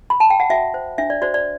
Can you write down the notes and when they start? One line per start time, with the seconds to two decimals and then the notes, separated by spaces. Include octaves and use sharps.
0.10 B5
0.20 A5
0.30 G5
0.40 F#5
0.50 F#4 E5
0.74 C5
0.98 D4 E5
1.10 D5
1.22 F#4 C5 D5
1.34 D5